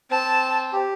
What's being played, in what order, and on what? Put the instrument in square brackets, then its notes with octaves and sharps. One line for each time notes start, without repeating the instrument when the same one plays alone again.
[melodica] C4 [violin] A5
[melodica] G4